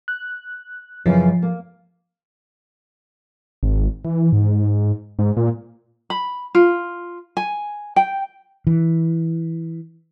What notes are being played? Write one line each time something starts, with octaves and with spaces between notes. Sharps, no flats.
F#6
F#2 C#3 E3 F3
A#3
G#1
E3
G#2
G#2
A#2
B5
F4
G#5
G5
E3